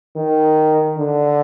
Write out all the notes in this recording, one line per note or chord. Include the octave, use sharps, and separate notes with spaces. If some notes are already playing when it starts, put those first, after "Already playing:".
D#3
D3